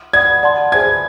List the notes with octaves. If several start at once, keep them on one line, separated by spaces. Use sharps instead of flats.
D5 F#5 B5 D#6 G#6
D5 F#5 A5 C6
G#4 C5 E5 G#5 G#6